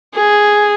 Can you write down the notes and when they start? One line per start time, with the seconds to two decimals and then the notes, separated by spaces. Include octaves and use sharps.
0.15 G#4